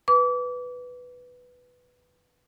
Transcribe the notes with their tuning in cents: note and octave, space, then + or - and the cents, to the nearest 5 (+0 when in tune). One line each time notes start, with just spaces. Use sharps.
B4 +0 D6 -30